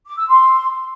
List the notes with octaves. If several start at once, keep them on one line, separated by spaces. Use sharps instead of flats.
D6
E6
C6